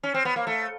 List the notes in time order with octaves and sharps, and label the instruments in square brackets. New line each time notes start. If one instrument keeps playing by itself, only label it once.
[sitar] C#4
C4
B3
A#3
A3